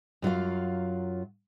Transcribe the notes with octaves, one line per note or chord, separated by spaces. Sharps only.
F#2 F#3 F4 F5